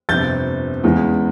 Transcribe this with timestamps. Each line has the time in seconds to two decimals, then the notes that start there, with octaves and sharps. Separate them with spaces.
0.09 G1 F2 C3 G6 A6
0.84 E2 C#3 E3 G#3